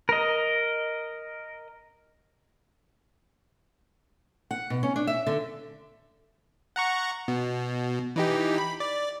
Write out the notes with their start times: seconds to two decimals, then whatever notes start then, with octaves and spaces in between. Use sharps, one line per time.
0.09 A#4 D#5
4.51 F#5
4.70 B2
4.83 C#4
4.96 D4
5.07 E5
5.27 D3
6.76 F#5 A#5 C#6
7.28 B2
8.16 E3 D#4 G4
8.58 B5
8.80 D5